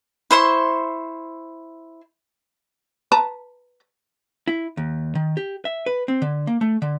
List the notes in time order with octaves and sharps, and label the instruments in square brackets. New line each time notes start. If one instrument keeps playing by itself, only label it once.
[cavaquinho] E4 C5 C6 C#6
[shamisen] B4 A5 A#5
[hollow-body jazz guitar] E4
D#2
D#3
G4
E5
B4
C4
D3
A#3
A3
D3